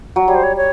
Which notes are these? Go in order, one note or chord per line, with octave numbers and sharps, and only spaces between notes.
F#3
G3 C#5
C5
C#5
C#5